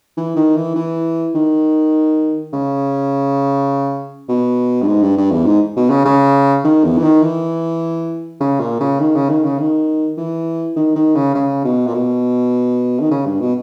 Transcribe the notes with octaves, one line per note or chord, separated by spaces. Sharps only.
E3
D#3
E3
E3
D#3
C#3
B2
G2
G#2
G2
G2
E2
G#2
B2
C#3
C#3
D#3
E2
E3
D#3
E3
C#3
A#2
C#3
D#3
C#3
D#3
C#3
D#3
E3
D#3
D#3
C#3
C#3
B2
A#2
B2
D#3
C#3
G2
B2